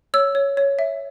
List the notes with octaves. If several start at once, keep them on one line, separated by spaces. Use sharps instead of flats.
C#5 E6
C#5
C#5
E5